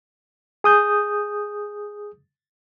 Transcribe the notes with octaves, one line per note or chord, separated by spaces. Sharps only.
G#4 D#6 G6